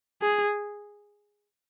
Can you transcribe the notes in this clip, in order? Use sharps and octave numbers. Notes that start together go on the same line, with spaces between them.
G#4